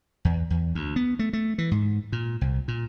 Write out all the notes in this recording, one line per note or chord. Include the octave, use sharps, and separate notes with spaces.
E2
E2
D2
B3
A3
A3
E3
G#2
A#2
C2
A#2